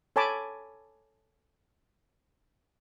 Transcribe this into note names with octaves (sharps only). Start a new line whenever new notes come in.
A4 C#5 G#5 A5 B5 D6